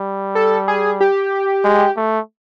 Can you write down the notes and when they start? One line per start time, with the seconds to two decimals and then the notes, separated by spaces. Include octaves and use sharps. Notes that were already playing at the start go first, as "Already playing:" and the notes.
Already playing: G3
0.35 A4
0.68 G#4
1.01 G4
1.64 G#3
1.96 A3